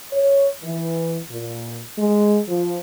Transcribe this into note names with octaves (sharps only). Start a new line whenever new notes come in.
C#5
E3
A#2
G#3
F3